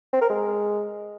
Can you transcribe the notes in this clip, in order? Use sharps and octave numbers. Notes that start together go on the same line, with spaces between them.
C4
A#4
G#3